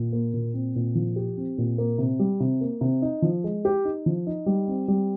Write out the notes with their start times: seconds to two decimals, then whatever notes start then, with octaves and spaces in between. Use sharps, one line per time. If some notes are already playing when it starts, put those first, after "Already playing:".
Already playing: A#2
0.13 A#3
0.34 A#2
0.54 C4
0.75 A#2
0.95 F3
1.16 G4
1.37 C4
1.58 A#2
1.78 A#3
1.98 C3
2.19 G3
2.40 C3
2.61 A#3
2.81 C3
3.02 D#4
3.22 F3
3.44 G#3
3.65 G4
3.85 D#4
4.06 F3
4.27 D#4
4.46 G3
4.68 C4
4.88 G3